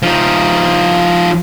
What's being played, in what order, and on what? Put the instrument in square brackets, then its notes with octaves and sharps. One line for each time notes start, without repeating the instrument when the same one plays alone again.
[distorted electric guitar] F3 D#4